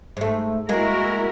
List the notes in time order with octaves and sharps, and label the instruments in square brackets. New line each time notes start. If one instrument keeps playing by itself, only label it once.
[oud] G#2 A3
[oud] G#3 A#3 [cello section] E4 F#4 A#4